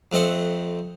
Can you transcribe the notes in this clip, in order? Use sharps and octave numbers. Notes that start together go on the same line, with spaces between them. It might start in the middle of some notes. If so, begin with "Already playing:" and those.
F2 A3 C4 D#5 F#5